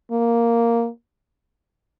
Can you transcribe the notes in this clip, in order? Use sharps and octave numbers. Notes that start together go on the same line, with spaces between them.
A#3